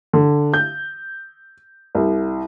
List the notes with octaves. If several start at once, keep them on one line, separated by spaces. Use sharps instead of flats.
D3
G6
C2